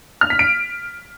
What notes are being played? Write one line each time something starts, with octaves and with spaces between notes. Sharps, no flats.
F6
B6
D7